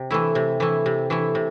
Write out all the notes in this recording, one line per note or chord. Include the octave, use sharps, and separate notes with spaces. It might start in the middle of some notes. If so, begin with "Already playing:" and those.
Already playing: C3
E3 A3 E4
C3
E3 A3 E4
C3
E3 A3 E4
C3